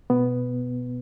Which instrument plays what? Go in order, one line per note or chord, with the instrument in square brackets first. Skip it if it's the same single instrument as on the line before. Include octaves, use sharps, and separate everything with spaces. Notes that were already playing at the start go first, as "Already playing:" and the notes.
[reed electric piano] B2 B3